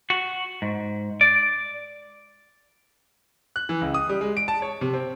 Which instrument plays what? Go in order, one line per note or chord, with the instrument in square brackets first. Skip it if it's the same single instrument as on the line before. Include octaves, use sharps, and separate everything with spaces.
[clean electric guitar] F#4
G#2
D5
[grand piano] F#6
E3
C#2
D#6
G3
G#3
D7
A5
C#5
C3
C4